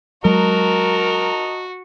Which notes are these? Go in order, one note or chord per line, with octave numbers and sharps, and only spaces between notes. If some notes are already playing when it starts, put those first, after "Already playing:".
F#3 G#3 F#4 A#4 D#5 A5 A#5